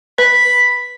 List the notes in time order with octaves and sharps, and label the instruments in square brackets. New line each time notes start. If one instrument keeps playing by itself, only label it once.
[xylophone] B4 [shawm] B5